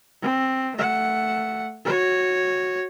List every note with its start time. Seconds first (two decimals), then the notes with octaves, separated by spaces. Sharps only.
0.22 C4
0.77 A3 F#5
1.85 F#4 C#5